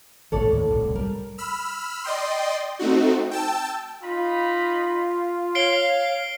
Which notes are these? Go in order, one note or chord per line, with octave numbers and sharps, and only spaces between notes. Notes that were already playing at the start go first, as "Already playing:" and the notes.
G#1 C#2 A2 A4 C#5 D5
D#2 A2
D#1 C2 A2
G3 A#4
B5 E6 F6
D5 D#5 G5 C6
A3 C4 D#4 F#4
G5 A5 E6
D#4 F4 B5
C#5 F5 C7 D7 G7